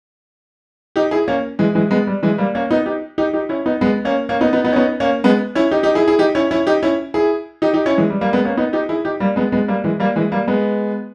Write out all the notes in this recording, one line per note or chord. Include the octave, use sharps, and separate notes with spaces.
D#4 G4
E4 G#4
A#3 C#4
E3 G#3
E3 G#3
G#3 B3
G3
E3 G#3
G3 A#3
A#3 C#4
B3 D#4
D#4 G4
D#4 G4
D#4 G4
C#4 E4
B3 D#4
G#3 B3
A#3 C#4
A#3 C#4
B3 D#4
B3 D#4
B3 D#4
C#4
B3 D#4
A#3 C#4
G#3 B3
C#4 E4
D#4 G4
D#4 G4
E4 G#4
E4 G#4
D#4 G4
C#4 E4
C#4 E4
D#4 G4
C#4 E4
E4 G#4
D#4 G4
D#4 G4
C#4 E4
E3 G#3
G3
G3 A#3
G#3 B3
A#3 C#4
B3 D#4
D#4 G4
E4 G#4
D#4 G4
G3 A#3
G#3 B3
G#3 B3
G3 A#3
E3 G#3
G3 A#3
E3 G#3
G3 A#3
G#3 B3